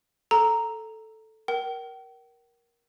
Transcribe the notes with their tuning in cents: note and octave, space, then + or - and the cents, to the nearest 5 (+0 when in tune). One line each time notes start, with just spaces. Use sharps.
A4 +0 A#5 +0
A#4 +15 G5 -40